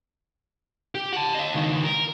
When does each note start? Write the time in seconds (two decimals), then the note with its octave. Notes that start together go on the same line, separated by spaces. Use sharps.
0.95 G4
1.13 F#5 A5
1.35 D#5 F5
1.54 C#2 D#3
1.84 A#4